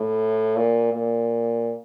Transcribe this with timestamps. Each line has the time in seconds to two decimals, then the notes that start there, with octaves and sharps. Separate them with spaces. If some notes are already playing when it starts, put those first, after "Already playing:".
Already playing: A2
0.56 A#2
0.94 A#2